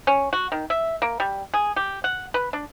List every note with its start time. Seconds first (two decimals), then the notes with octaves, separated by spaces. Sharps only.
0.07 C#4
0.33 F#4
0.52 D#3
0.70 E5
1.02 A#3
1.20 G3
1.54 G#4
1.76 G4
2.04 F#5
2.34 B4
2.53 D4